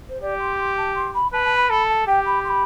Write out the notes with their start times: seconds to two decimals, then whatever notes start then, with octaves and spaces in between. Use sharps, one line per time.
0.09 C5
0.21 G4 D5
0.40 C6
0.58 C6
0.77 A5
0.95 C6
1.14 B5
1.33 B4 A5
1.45 A5
1.57 B5
1.70 A4 B5
1.89 A5
2.07 G4 G5
2.26 B5
2.44 C6
2.49 B5